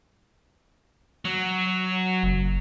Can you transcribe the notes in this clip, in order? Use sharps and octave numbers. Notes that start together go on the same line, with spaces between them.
F#3
F#1